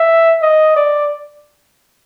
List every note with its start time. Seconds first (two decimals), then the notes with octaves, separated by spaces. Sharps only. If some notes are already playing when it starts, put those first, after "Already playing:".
Already playing: E5
0.42 D#5
0.76 D5